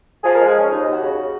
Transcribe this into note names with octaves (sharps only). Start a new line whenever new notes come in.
F3 G#4
A#4
G#3
G#4
F3 C#4
D#2 D#4
D#2
F#4
C#3
C#3